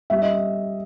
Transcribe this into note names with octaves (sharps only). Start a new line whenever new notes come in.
G3 E5
D#5